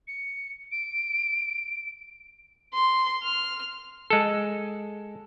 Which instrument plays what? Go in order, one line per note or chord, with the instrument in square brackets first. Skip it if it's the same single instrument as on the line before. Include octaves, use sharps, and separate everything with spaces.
[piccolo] C#7
D7
[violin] C6
F6
[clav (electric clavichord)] G#3 A4